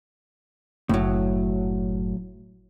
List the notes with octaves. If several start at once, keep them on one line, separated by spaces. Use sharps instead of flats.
F#1 A2 F#3